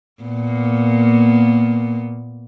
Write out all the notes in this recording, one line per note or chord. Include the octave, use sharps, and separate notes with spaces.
A#2 A#3 B3